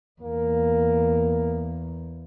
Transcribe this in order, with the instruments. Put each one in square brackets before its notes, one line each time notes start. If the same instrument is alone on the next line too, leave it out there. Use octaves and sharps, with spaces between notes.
[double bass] E2 [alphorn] A#3